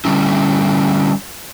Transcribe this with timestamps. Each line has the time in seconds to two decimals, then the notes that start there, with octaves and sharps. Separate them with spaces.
0.05 D3 G3 C#4 E4